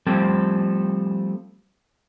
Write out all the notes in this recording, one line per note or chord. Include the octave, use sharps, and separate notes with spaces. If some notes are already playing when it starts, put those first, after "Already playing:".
F3 G3 A3 C4 A4